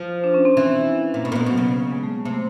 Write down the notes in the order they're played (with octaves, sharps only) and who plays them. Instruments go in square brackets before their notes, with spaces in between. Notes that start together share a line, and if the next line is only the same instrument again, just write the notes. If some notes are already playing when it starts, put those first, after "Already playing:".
Already playing: [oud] F3
[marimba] D4
C#4
C4
[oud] E3
A#2
[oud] B2 [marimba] B3
[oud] A#2 [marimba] A#3
[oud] B2
[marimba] B3
[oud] B2
[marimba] F#3
[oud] C#3
[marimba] G#3
A3
A#3
[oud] C3 [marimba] A#3
[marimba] A3